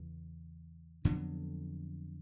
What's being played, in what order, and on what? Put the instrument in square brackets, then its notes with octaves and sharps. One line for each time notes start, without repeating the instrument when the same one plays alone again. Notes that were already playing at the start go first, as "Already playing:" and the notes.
Already playing: [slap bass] E2 C#3 E3
F2 D3 F#3 B3